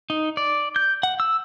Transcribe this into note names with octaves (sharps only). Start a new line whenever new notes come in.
D#4
D5
G6
F#5
E6